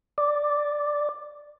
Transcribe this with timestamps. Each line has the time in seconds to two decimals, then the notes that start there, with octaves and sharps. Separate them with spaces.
0.18 D5